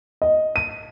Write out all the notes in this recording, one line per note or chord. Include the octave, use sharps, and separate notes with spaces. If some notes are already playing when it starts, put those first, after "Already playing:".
D#5
D#7